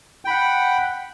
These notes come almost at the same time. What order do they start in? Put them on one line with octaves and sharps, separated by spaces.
G5 B5 F#5